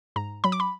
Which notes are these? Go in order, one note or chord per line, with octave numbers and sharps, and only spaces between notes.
G#2 A#5
F#3 B5
D6
B5